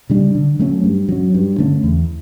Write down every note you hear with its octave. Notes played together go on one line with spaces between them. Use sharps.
C#3 G3 D4
D3
F#3 A3 C#4
G2
F#3 C#4
G2
D3 A3 C#4
E2